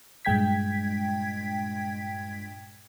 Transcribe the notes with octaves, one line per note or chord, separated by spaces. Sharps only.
G2 A#2 G#3 G5 G#6 B6